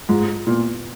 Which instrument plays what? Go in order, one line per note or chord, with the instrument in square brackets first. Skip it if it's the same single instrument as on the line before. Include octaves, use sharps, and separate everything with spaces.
[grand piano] G#2 [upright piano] F4
[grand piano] A#2 [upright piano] B3